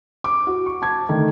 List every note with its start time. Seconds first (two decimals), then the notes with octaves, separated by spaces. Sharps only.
0.24 D6
0.47 F#4
0.66 C#6
0.82 A5 D6 G#6
1.09 D3 D#3 A3